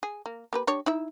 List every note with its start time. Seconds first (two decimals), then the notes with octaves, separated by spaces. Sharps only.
0.03 G#4
0.26 A#3
0.53 A#3 G4 B4
0.67 D4 G4 C#5
0.86 D#4 E4 E5